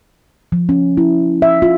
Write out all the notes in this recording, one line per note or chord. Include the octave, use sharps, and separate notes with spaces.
F3
C#4
E4
E5
F4